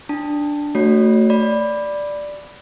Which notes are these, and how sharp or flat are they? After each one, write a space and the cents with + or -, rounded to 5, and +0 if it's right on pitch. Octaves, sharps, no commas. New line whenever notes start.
D4 +0 A5 +10
A3 +20 F#4 +0 C#5 +0
D5 +0 B5 +0